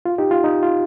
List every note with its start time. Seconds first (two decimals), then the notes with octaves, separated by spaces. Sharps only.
0.05 F4
0.18 D#4 G4
0.31 F4
0.44 D#4
0.63 F4